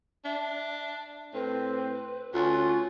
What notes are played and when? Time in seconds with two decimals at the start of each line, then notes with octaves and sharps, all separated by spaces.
0.25 D4 E5
1.34 A2 C4 B4
2.34 D2 C#4 F4 F#6